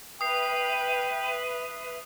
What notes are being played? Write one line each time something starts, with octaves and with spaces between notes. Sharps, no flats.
B4 E5 G5 D#6 C7